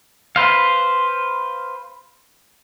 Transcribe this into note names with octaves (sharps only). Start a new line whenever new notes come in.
B4 C5 F5